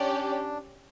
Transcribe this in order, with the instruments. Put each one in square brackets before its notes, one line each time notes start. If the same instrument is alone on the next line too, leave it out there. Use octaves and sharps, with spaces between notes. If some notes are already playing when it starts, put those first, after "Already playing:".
Already playing: [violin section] C#4 G4 D5 [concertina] D4